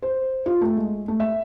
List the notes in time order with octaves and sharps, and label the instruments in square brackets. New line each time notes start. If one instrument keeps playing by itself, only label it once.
[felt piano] C5
F4
A3
G#3
A3
E5